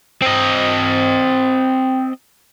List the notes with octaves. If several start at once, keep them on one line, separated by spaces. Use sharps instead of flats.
C4 D#5